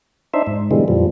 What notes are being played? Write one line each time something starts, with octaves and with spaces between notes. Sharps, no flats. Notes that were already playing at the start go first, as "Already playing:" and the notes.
D4 D#4 C5 E5
G#2
B2 D3 E3 G3 G#3
F2 A#2 F3 G3